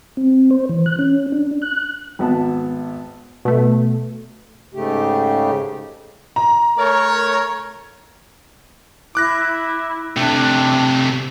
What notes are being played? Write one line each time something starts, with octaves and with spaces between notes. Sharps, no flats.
C4
C5
E3
F#6
C#4
D4
F#6
G#1 B3 A5
B2 A3
G#2 C#3 A3 G4
A#5
A3 A#4 C#5
E4 D6 F#6 A#6
C3 A3 D4